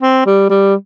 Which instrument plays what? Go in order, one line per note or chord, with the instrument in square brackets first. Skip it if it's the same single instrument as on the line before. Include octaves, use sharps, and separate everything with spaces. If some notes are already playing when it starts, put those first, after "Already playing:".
[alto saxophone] C4
G3
G3